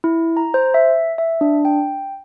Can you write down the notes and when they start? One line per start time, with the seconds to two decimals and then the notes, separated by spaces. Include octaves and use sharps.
0.04 E4
0.37 A#5
0.54 C5
0.74 E5
1.18 E5
1.41 D4
1.65 G5